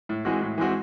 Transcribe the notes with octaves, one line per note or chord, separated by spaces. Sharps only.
A2
E3 G#3 C4 F#4
A2
E3 G#3 C4 F#4